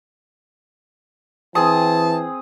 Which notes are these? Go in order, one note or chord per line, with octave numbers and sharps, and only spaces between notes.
E3 C4 G#4 A5 D#6